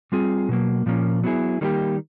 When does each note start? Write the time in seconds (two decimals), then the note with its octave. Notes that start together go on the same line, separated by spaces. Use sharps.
0.12 G3 C4 F4 G#4
0.49 B2 F#3 A#3
0.86 A#2 F3 A#3 C#4
1.24 F#3 B3 E4 G#4
1.61 D#3 G3 A#3 D#4 G4